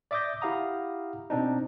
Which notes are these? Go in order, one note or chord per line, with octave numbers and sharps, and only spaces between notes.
D5 E5 D6 D#6 G6 A#6
E4 G4 F5 F#5 A#5 D#6
B2 C4 D4 D#4